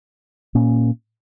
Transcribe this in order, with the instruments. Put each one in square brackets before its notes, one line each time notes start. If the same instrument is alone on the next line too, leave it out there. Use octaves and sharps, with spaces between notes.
[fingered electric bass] A#2 A#3 C#4